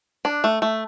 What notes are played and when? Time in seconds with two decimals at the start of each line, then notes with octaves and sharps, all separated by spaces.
0.25 D4
0.44 A3
0.62 A3